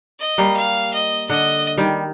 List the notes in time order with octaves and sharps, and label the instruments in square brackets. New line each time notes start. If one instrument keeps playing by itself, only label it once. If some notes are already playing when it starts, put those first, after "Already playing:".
[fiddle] D#5
[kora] G3 A#3
[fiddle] F5
D#5
[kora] D3 [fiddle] D#5
[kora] D#3 G3